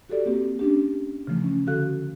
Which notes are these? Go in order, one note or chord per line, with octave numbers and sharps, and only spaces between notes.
F#4 G4 A4 D5
A#3 C4 G4
C#4 D4 G4
C#3 E3 F3 A3
C#4
D3 F#4 A4 F5 F#6